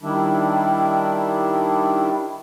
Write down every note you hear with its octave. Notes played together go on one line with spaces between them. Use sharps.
D#3 G3 D4 E4